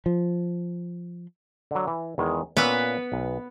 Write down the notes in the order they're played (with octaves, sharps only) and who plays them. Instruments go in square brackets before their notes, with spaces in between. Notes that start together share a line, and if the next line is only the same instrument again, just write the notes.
[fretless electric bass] F3
[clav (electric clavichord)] D3 F#3
E3
E2 D#3 G#3
[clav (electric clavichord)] A#2 C#4 E5 [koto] B3 B4
[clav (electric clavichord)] B1